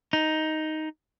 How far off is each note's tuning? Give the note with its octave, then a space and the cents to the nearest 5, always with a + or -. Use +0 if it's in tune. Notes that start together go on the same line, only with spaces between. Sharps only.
D#4 +5